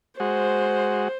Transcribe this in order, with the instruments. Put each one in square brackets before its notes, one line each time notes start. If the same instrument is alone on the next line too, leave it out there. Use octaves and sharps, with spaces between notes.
[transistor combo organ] G#3 F#4 [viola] C5